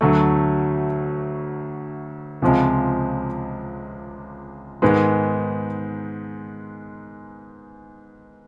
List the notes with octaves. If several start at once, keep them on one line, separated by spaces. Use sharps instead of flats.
D2 D3 F#3 A3
C#2 C3 F3 G#3
G#2 D#3 G#3 B3